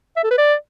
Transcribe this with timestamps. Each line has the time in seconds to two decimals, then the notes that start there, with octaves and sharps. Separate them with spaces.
0.16 E5
0.23 A4
0.31 B4
0.38 D5